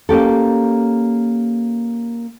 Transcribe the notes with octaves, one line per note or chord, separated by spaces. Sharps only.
A#3 C#4 G4 A4